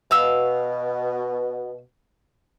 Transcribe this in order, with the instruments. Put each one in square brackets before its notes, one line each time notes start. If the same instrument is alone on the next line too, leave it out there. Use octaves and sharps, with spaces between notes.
[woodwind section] B2 [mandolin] F5 E6